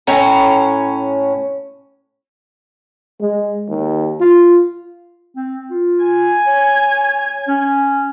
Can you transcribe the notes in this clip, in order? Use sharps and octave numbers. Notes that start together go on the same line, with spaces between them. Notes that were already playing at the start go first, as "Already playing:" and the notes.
A2 C#4 A#5
G#3
D#2
F4
C4
F4
G#5
C#5
C#4